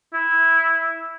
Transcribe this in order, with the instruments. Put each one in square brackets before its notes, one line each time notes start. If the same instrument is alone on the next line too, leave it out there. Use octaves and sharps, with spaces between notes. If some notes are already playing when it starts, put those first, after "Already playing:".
[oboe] E4